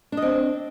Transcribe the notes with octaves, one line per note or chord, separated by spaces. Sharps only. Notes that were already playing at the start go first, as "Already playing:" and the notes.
C4 D4 D#5